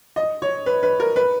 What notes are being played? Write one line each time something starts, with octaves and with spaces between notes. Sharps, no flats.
D#5
C#5
B4
B4
A#4
B4